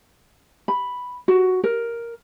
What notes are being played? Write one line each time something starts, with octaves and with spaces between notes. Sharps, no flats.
B5
F#4
A#4